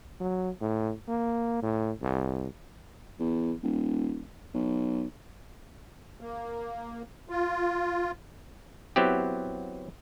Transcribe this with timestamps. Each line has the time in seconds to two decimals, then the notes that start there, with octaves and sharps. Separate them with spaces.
0.21 F#3
0.61 A2
1.08 A#3
1.62 A2
2.02 C2
3.20 E2
3.63 D#1
4.54 B1
6.21 A#3
7.29 F4
8.96 F#3 B3 C4 E4 G4